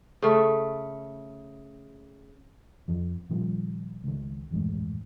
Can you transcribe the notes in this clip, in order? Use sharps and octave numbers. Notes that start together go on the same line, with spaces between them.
C#3 A3
F2 F3
A#2 D#3 F3 G3
C#2 D#3
D#1 A1 F#2 G#3